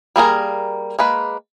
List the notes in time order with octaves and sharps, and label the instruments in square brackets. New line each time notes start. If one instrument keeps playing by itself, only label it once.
[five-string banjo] G3 A#3 G#4 A#4
G#3 A#3 B4